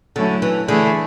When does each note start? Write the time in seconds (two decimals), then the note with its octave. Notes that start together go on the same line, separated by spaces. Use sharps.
0.16 D3 F#3 A3 C#4 E4
0.42 E3
0.68 D3 E3 A3 E4 G#4